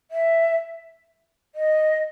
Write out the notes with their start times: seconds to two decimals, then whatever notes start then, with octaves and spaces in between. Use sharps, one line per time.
0.11 E5
1.55 D#5